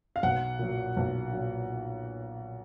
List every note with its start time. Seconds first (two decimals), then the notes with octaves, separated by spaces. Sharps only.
0.16 F5
0.23 B1 F#5
0.59 A#2 F#3
0.97 B1
1.33 A#2 F#3